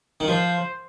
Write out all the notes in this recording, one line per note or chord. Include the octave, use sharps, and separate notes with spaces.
D#3
F3 C5